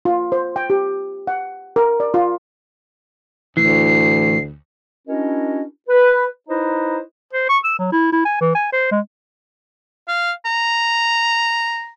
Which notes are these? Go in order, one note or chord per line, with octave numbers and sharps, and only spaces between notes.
F4
C5
G5
G4
F#5
A#4
D5
F4
D2 A2 E3 C7
C#4 D4 E4 F#4 A#4 D#5
B4
D#4 E4 B4 C5 D#5 A#5
C5
C#6
E6
F#3
E4
E4
G#5
E3
G#5
C5
G#3
F5
A#5